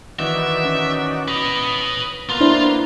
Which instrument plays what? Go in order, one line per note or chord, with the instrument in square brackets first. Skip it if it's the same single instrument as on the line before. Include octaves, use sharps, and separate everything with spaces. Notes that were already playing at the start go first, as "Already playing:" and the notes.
[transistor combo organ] D#3 F#4 D5 [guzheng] E3 D#4 E4 [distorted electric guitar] E5
[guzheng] C#4
[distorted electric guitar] B4 D#5 [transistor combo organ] D#6
[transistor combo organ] A#3 B3 [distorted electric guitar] F4 F5
[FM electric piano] D4 E4 C5